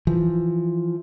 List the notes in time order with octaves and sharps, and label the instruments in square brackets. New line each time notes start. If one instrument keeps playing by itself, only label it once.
[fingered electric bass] E3 F3